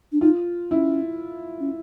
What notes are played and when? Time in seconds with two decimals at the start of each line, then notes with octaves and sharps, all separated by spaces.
0.12 D4
0.21 D#4 F4
0.70 C#4 E4
1.59 C#4